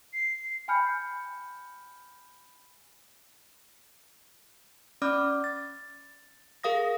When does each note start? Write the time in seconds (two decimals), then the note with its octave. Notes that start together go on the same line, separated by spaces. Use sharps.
0.13 C7
0.68 G5 G#5 B5 F6 G6 C#7
5.02 C#4 D5 B5 D6 F6
5.44 A6
6.63 G#4 A#4 F5 D#6 A#6